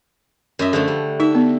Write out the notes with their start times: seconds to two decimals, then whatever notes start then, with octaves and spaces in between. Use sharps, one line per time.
0.59 F#2 D#5 E5
0.73 D3 F3 A3
0.88 G3
1.20 D#4 E5
1.35 B3